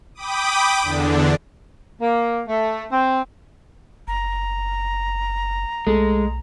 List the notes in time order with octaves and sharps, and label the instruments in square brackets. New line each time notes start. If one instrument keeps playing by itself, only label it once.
[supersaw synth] G5 B5 D6 D#6
E2 D3 D4
[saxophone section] A#3
A3
C4
[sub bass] F#1 [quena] A#5
[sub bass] B1 [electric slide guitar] G#3 [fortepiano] A3